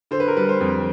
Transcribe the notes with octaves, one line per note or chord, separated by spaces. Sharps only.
D3 C5
B4
A#4
G3 B4
C5
F2